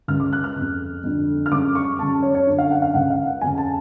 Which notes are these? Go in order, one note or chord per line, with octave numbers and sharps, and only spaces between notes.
C#2 C#3 F6
D6
F#6
F6
F2 C#3
F2 D3
F6
F#2 C#3 D6
C#6
F#2 C#3 A5
C#5
C#5
F#2 D3
F5
F#5
F5
C#2 C#3 F#5
F5
F#5
F2 C#3 G#5
A5